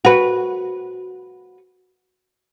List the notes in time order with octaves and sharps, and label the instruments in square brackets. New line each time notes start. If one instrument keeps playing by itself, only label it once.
[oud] F#4 B4